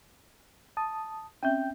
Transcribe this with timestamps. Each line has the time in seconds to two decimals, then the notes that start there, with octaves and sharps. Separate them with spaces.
0.77 A5 D#6
1.43 C4 C#4 E5 G5 G6